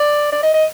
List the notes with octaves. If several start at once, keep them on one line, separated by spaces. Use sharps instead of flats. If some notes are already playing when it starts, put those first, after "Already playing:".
Already playing: D5
D5
D#5
D#5